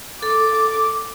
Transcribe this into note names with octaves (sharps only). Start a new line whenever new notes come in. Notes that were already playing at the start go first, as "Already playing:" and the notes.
A4 D6